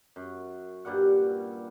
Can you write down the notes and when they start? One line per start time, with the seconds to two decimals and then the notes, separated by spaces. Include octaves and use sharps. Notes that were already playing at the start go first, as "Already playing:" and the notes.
0.16 F#2
0.85 G2 A#2 G3 F#5